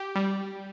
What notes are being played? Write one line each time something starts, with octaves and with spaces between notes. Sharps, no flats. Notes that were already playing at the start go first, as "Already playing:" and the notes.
Already playing: G4
G3